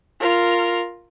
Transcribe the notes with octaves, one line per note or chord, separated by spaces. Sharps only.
F4 A#4